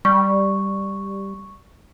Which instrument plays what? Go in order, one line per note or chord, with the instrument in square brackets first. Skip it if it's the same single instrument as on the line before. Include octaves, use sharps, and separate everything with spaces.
[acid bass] G3 [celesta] C#6